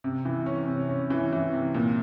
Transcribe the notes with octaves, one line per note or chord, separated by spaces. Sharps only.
C3
E3
C#4
C3
C#4
E3
E3
C3
A#2